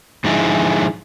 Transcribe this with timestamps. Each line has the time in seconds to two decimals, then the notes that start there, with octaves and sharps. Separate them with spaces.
0.24 G#2 D3 F3 D#4 E4 G#4